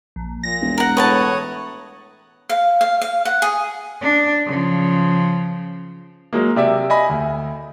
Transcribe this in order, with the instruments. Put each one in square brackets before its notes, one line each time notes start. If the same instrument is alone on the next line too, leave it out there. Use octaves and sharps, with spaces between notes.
[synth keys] A#1
[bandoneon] A#2 [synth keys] A#6
[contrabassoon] E1
[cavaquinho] A#4 F#5
[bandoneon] A2 C#5 D#6 [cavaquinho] B4 F#5 A5 [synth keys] C#6
[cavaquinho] F5
F5
F5
F#5
G#4
[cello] D4
C#3 F3
[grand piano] F#3 G#3 A#3
C3 D5 E5
D#5 G#5 B5
D2